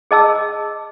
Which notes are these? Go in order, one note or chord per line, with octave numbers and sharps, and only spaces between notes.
G#4 D#5 A5 E6